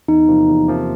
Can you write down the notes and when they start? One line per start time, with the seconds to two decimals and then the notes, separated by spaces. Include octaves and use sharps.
0.08 E2 D#4
0.28 C3 F3 A#3
0.48 E2
0.68 C3 F3 A#3